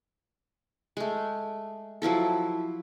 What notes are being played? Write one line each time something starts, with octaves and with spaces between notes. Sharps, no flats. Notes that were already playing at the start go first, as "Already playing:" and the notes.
G#3 A3
F3 F#3 E4 A4